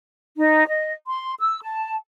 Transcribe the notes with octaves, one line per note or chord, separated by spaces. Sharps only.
D#4
D#5
C6
E6
A5